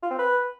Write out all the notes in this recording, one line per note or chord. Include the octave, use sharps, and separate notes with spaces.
F4
C4
B4